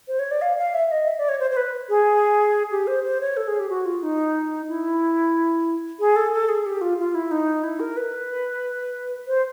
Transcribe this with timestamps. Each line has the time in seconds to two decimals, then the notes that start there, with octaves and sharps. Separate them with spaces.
0.08 C5
0.19 C#5
0.31 D5
0.42 F5
0.57 F5
0.74 E5
0.91 D#5
1.08 E5
1.18 D5
1.29 C#5
1.40 C5
1.51 C5
1.57 B4
1.89 G#4
2.71 G4
2.87 C5
3.04 C5
3.21 C#5
3.37 A4
3.48 G#4
3.60 G4
3.69 F#4
3.86 F4
4.03 D#4
4.69 E4
6.00 G#4
6.16 A4
6.33 A4
6.49 G#4
6.66 G4
6.81 F4
6.98 F4
7.15 E4
7.31 D#4
7.64 E4
7.80 A#4
7.97 B4
9.28 C5